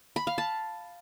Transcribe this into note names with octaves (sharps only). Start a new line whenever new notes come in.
B5
F5
A5